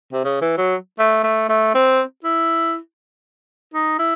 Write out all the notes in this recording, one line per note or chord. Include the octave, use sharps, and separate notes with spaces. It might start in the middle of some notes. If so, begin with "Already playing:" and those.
C3
C#3
E3
F#3
A3
A3
A3
C4
E4
D#4
E4